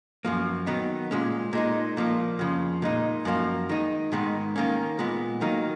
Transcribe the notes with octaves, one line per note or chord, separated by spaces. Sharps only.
F#2 F3 A#3
D#3 F#3 B3 D#4
A#2 G#3 C#4
A#2 G#3 D#4
A#2 F3 A#3
F2 C#3 F3
A#2 G#3 D#4
F#2 F3 A#3
D#3 G#3 D#4
G#2 D#3 G#3 B3
D#3 A#3 C#4
A#2 G#3 B3
D#3 F#3 A#3 D#4